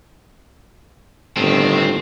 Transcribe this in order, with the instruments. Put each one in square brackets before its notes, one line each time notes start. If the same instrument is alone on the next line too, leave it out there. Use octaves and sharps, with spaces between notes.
[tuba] G1 [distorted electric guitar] A2 D#3 [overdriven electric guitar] C4